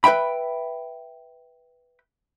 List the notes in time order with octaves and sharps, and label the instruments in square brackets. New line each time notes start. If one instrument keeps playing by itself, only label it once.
[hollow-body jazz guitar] B4 C5 E5 G5 B5